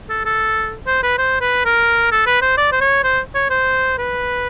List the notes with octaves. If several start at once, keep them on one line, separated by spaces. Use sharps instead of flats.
A4
A4
C5
B4
C5
B4
A#4
A4
B4
C5
D5
C5
C#5
C5
C#5
C5
B4